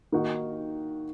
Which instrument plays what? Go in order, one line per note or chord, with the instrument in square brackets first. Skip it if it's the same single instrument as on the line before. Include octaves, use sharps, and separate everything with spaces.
[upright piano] D#3 A#3 D#4 F#4